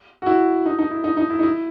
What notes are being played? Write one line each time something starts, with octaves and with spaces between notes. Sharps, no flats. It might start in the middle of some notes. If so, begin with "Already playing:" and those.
F#4
E4
D#4
D#4
E4
D#4
D#4
E4
D#4
E4